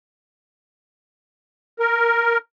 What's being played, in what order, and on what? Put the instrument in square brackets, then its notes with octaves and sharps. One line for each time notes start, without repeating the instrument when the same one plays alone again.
[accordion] A#4